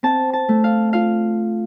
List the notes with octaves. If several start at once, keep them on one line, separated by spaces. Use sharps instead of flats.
C4 A5
A5
A3
F5
F4 F5